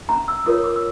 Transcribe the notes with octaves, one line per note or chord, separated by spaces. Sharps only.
C#4 A#5
E6
F4 A#4 C#5 D#6
D6
E6